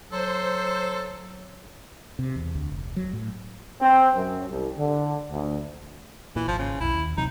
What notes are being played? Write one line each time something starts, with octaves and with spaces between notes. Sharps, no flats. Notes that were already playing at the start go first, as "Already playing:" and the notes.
F#3 A4 C5
C3
E2
D2
F1
F#3
A2
C4
F#2
C2
D3
D2
A#2 E3
G#1 F3
C#3
B1 F2 E4
D#2
A1 C3 F#3 D#4